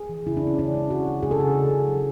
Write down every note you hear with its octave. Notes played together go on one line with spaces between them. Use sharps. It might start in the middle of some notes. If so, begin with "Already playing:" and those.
Already playing: G#4
E3
C#3 E4
D4
C#3 C#4
E3 D4
G#3
C#3 F#4
C#3
C#3 G#4
A4
C#3 G#4
C#3
C#3
F#3